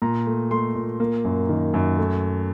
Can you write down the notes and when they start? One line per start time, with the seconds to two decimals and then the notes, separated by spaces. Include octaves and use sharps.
0.02 A#2 A#5
0.27 A3
0.51 A3 C6
0.75 A#2
1.00 A#3
1.25 F#2
1.49 D#3
1.74 F#2
1.98 A3